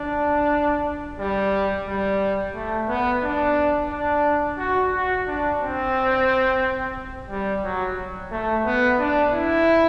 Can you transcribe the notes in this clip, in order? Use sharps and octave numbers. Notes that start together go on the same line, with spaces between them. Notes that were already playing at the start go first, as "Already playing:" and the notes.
Already playing: D4
G3
G3
A3
B3
D4
D4
F#4
F#4
D4
C4
G3
F#3
A3
B3
D4
E4